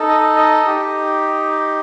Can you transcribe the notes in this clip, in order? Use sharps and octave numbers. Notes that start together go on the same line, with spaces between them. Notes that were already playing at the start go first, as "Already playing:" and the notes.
Already playing: D#4 A4
D#5
D#5
D#4 G4